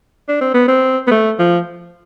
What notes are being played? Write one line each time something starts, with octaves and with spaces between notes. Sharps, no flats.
D4
C4
B3
C4
B3
A3
F3